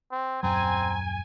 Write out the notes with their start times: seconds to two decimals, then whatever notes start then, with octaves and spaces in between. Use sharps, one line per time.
0.11 C4
0.43 D#1 F#2 F#3 C4 G#5 A#5